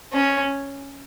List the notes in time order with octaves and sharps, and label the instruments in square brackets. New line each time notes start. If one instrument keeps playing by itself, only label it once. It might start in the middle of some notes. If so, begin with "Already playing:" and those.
[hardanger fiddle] C#4